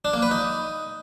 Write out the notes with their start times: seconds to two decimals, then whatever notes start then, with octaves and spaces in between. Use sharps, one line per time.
0.05 D4
0.13 A#3
0.22 B4
0.31 D#4